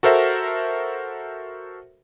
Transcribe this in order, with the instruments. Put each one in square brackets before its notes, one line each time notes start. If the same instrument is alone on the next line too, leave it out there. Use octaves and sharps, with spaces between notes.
[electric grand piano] F#4 A4 A#4 C5 E5